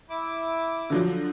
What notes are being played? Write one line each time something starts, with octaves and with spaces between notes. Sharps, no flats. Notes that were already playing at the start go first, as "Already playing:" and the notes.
E4 D6
D3 F3 F#3